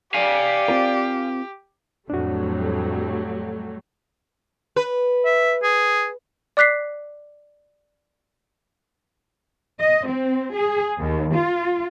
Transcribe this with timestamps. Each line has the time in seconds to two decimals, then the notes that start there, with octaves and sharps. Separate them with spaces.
0.14 G4 D5 F5 G#5
0.68 C4 F4 A#4
2.10 F2 A2 F#3 G3 A3 D4 F#4
4.76 B4
5.25 E5
5.63 G#4
6.57 D5 D6 F#6 B6 C7
9.79 D#5
10.08 C4
10.53 G#4
11.00 D#2
11.33 F4